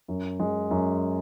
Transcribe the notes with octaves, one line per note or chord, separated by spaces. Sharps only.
F#2
G#3
F#2